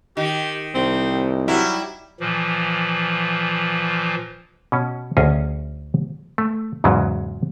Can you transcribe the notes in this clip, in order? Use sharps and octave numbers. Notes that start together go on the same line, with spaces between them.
D#3 G4
C2 C4
F#3 G3 E4
A#2 E3 F3
B2 C#4
D2 C#4 G#4 D#5 G#5 A#5
A3
E2 G#2 C#3 F#3